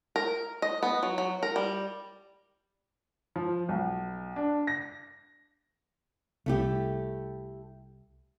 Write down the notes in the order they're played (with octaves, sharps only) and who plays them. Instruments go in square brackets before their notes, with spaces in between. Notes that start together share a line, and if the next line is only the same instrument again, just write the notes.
[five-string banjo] A#4
D#5
B3
F#3
F#3
A#4
G3
[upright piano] F3
B1
D4
A#6
[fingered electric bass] C2 [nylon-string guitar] A3 E4 G4